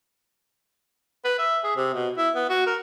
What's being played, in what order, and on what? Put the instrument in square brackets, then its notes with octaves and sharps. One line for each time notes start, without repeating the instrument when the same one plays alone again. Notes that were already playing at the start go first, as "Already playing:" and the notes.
[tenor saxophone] B4
E5
G#4
C3
B2
E4
B3
F#4
A#4